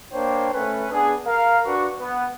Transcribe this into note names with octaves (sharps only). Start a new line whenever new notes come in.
A#3 D4 C5 C#5 G5
A3 C#4 B4
B3 D4 G#4
A#4 F5
D4 F#4 B4 C#6
B3